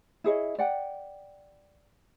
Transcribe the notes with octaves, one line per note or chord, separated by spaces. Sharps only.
E4 G#4 C#5 D#5
D5 F#5 G5